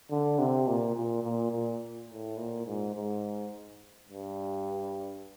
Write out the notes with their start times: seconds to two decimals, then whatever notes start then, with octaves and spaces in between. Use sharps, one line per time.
0.11 D3
0.39 C3
0.68 A#2
0.96 A#2
1.23 A#2
1.52 A#2
2.09 A2
2.37 A#2
2.66 G#2
2.95 G#2
4.09 G2